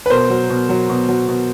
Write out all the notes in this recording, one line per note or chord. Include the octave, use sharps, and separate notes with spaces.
B4
B2 A#4 C5
F#3
B2
F#3
B2
F#3
B2